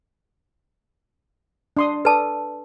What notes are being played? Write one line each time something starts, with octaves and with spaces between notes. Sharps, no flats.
D4 C6 D#6
A4 B4 D5 A5 D#6